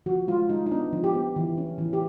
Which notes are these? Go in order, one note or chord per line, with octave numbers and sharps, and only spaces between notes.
F3 F#4
G#3 F4
G#3 D#4
D#4
B3 D4
F3
G4
B3
E3
C#4
E3
G4